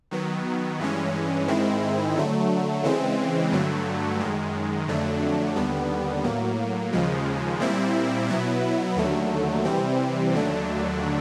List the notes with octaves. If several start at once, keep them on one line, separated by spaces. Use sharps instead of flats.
D#3 F#3 B3
G2 E3 G#3 C#4
G#2 D#3 G#3 C4 E4
D3 F#3 A3
C#3 E3 G#3 C4
G2 D3 F#3 A3
F#2 D#3 G#3
F2 D3 F#3 A3 D4
D#2 D3 G3 B3
A2 F#3 A#3
D#2 C#3 F3 G#3
A#2 G3 C4 E4
B2 F#3 B3 E4
D#2 D3 F#3 A3
C3 E3 G3 C4
D#2 D3 F#3 A3 D4